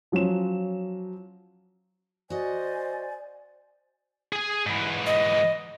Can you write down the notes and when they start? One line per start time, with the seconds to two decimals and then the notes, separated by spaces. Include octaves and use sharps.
0.12 F3 F#3 C#4 F4 E7
2.30 F#4 C5 D5 D#5 G#5
4.33 G#4 G#5
4.66 G#2 E3
5.06 D#5